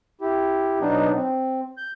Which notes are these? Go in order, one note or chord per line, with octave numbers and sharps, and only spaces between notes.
E4 G4
B2 F#3 B3 D4 D#4
C4
G6